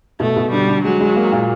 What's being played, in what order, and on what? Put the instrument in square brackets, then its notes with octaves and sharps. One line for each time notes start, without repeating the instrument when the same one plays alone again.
[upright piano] B2 [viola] A3
[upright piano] B2
[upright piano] D3 [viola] G3
[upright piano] D3
[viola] F#3 [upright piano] G#3
[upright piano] G#3
A#3
A#2